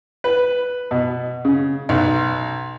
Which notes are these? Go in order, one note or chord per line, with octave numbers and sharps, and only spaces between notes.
B4
B2
C#3
B1